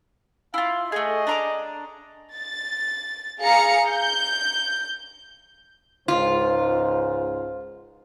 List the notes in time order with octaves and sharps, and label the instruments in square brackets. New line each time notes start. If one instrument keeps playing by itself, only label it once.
[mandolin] E4 F4 [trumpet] F5
[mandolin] A3 C#4 G#4 [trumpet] D#5
[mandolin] D4 A#5 D6
[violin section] A6
G#4 F5 A#5 C#7
G6
[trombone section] C#2 G#2 [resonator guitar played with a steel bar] F4 [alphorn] C5